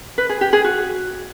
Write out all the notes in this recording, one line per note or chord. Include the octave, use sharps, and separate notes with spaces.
B4
G#4
G4
G#4
F#4